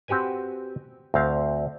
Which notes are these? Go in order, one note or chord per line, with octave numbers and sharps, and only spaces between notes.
C4 F#4 G4 B4 G#5
D2 C4 F5